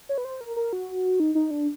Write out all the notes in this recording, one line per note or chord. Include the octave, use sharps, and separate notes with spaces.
C#5
B4
C5
A#4
A#4
F#4
D#4
D#4
D4